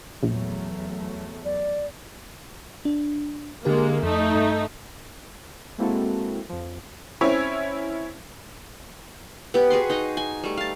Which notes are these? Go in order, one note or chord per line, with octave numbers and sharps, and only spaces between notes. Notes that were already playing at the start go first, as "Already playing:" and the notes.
A#1 E2 F#3 A3
D5
D4
D3 G#3 A#3 G4 A#4
F2 A3 D#4
G2
G#3 A#3 C4 E4 F#4 A4
F2 F3
C4 C#4 E4 C#5
B3 G4
F#4 G#4 B4 C6
D#4 D#5
G#5
G3 A3
F5 A5